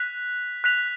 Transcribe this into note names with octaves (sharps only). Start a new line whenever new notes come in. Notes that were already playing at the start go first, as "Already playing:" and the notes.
Already playing: F#6 B6 F7
F#6 B6 F7